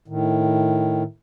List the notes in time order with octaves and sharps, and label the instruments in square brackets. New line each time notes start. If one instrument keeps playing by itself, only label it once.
[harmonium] A2 D#3